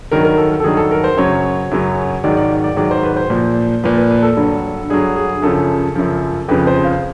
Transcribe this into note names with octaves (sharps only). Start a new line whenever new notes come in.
G2 D#3 F#3 A#4
A#4
A4
A4
G2 D#3 F#3 G#4
A4
A#4
C5
F#2 C#3 F#3 C#5
F#2 C#3 F#3
G#2 D#3 F#3 D5
D5
D5
G#2 D#3 F#3 D5
C5
B4
C5
A#2 F3
A#2 F3 B4
B4
B4
A4
G2 D3 F#3
G2 D3 F#3 G#4
G#4
F#2 C#3 F3 A4
F#2 C#3 F3
F2 C#3 F3 B4
C5
F5